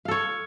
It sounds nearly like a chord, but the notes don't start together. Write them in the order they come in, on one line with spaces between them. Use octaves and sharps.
F5 A4 C#5